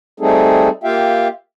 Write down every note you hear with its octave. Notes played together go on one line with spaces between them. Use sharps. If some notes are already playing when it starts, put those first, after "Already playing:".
G3 A3 C4 D#4 G#4 A4
A#3 F4 G4 E5 F5 G5